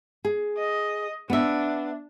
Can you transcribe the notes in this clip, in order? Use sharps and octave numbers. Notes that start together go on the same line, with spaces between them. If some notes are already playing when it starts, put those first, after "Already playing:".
G#4
D#5
B3 D4 E5